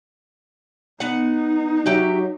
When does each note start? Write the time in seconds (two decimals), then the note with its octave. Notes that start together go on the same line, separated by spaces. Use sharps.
1.00 B3 D#4 F#5
1.86 F#3 F#4 G4 E5